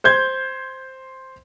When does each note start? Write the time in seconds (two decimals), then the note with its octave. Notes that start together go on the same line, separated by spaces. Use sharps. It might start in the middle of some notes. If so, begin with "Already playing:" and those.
0.04 C5 C6 G6 G#6